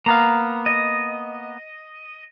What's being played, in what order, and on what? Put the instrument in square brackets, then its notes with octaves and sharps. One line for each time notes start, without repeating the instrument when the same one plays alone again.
[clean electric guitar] A#3 B3 F5 [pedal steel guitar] A#5
[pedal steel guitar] D#5